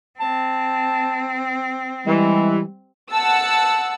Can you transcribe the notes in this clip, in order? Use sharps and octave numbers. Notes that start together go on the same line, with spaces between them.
C4 A5
E3 G3 G#3
F#5 A5 E6